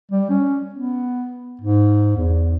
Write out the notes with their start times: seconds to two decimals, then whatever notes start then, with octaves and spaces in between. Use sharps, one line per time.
0.12 G3
0.30 C#4
0.74 B3
1.61 G#2
2.16 E2